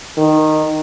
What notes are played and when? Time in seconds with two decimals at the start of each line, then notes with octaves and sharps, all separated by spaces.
0.17 D#3